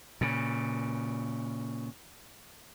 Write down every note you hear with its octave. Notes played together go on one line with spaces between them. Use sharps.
A#2 C#3